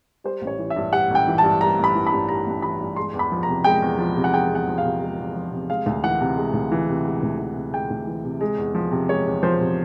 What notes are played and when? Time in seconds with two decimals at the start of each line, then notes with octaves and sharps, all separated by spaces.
0.24 G3 C5
0.42 A1
0.47 C#5
0.59 E3
0.70 E5
0.76 G2
0.92 G3 F#5
1.10 A1 G5
1.28 E3
1.38 A5
1.44 G2
1.61 G3 A#5
1.79 A1
1.84 B5
1.95 E3
2.07 B5
2.12 G2
2.29 G3 A#5
2.47 A1
2.62 E3 B5
2.80 G2
2.96 G#3 C6
3.14 E2
3.19 B5
3.32 F3
3.43 A#5
3.49 C3
3.64 G#3 G5
3.82 E2
3.98 F3
4.16 C3
4.24 F#5
4.34 G#3 G5
4.50 E2 F#5
4.68 F3
4.78 F5
4.84 C3
5.02 G#3
5.19 E2
5.36 F3
5.52 C3
5.70 G#3 F5
5.86 D2
6.04 E3 F#5
6.21 C3
6.37 G#3
6.54 D2
6.72 E3
6.89 C3
7.05 G#3
7.23 D2
7.39 E3
7.56 C3
7.73 G#3 G5
7.90 D2
8.07 E3
8.25 C3
8.41 G#3
8.58 E2
8.75 F3
8.92 C3
9.09 G#3 C#5
9.26 E2
9.43 F3 C5
9.61 C3